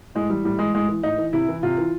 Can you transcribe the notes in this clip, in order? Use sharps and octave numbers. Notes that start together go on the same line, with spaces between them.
A2 G#3
E3 G3
A2 G3
E3 G#3
A2 G#3
E3
A2 D#4
E3
C3 E4
E3
C3 F4
E3